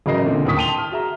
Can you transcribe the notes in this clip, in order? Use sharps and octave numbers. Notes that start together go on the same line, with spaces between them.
A1 C#3 F#3 A#4 D#5 C7
A#2 D3 C4
D#2 A2 E4 C#6 D#6 B6
G5 A5 C6 D#7 F7 G7
F6
F#4 G#4 E5 A#5